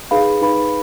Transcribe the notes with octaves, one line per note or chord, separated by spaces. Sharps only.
D#4 G#4 B4 F5 B5
D#4 G#4 B4 F5 B5